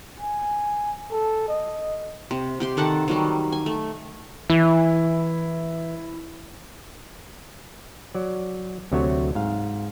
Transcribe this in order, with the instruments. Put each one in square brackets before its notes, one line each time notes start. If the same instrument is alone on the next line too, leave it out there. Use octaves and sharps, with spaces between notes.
[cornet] G#5
A4
D#5
[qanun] C3
C3 G4 C6
D#3 A4 F#5 A5
D#3 F#3 G3
G#5
A3
[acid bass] E3 [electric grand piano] E4
[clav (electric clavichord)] F#3 D5
D2 C3 F#3 A3 F#4 C#5
G#2 F5